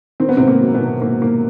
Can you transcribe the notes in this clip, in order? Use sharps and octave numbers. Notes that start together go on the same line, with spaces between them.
D#3 C4
B3
C3 C4
G#2
A#3
F#3
B2 B3
D#3
G#2 A#3
G#2 A#3